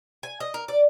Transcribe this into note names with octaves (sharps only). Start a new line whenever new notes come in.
G#5
D#5
A#4
D5